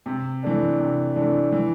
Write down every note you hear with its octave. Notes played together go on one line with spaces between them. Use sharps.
C3
E3 A3 D4
C3
E3 A3 D4
E3